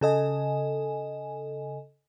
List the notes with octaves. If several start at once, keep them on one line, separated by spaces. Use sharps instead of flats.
C#3 A4 D#5 G#5